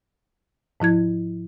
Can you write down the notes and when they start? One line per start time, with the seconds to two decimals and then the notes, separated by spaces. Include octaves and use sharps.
0.80 G#2 F3 E4 G#6